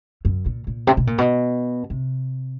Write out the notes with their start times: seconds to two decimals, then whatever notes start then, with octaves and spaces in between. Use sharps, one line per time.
0.25 F#2
0.46 A#2
0.67 A#2
0.87 C3
0.97 B2
1.07 A#2
1.18 B2
1.90 C3